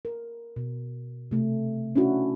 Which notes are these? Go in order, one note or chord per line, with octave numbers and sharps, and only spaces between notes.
A#4
B2
C3 A3
C#4 D4 E4 F#4